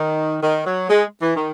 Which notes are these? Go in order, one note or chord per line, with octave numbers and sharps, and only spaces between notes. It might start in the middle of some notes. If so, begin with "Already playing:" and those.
Already playing: D#3
D#3
F#3
G#3
E3
D#3